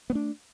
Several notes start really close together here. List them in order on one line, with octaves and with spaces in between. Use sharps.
B3 A3 D4